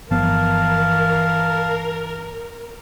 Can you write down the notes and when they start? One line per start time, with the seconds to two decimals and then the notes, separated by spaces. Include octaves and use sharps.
0.11 G1 E3 F3 B3 A#4 F5 A5